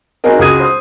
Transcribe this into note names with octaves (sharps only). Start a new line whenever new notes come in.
C4 D#4 F#4 G#4 A#4 D#5
C#2 G#3 F#4 D#6 G#6 D#7
C5 D#6